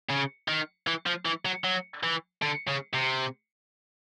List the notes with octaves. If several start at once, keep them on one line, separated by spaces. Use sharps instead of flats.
C#3
D#3
E3
F3
E3
F#3
F#3
E3
D3
C#3
C3